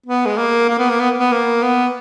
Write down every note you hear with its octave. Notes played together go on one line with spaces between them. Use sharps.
B3
G#3
A#3
A#3
B3
A#3
B3
B3
A#3
B3